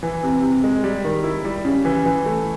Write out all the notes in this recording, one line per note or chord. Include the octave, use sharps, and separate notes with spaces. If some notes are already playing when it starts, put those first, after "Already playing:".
E3
C3
C3
G#3
G3
D#3
E4
G3
C#3
E3
E3
A3